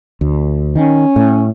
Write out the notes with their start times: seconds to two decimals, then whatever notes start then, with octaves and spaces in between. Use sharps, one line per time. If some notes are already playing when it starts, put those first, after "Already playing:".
0.21 D2
0.76 D#3 C#4
1.16 A2